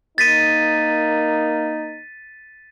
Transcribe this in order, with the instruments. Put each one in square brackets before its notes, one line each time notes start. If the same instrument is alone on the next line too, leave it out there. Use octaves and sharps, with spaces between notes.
[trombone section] A#3 D#4 [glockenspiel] A6 B6 D#7